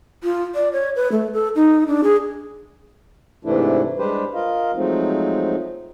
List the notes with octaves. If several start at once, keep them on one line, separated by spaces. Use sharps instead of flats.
F4
D5
C#5
B4
A3
A4
D#4
D4
G#4
G#2 C3 E3 A3 D4 E4
G3 G#3 D4 G4 B4 C5
F4 A#4 D#5 F5
F3 F#3 G#3 A3 C4 D#4